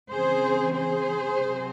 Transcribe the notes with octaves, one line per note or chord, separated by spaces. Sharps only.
C#3 E3 C4 G#4 C5
G#4 C5
C3 F#3 C4